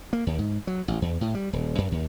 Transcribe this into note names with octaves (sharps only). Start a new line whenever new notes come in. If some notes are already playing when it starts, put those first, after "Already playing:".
A#3
D#2
G#2
F#3
A1
E2
A2
G3
D#1
F#2
D#2